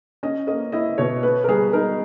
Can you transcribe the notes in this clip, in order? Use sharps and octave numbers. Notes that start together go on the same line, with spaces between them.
C#4 D#5
A#3 D#5
E4 D#5
B2 C#5
B3 B4
A#4
G3 G#4
D#4 A#4